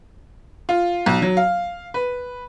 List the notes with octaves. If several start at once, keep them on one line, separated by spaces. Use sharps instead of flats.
F4
B1
F#3
F5
B4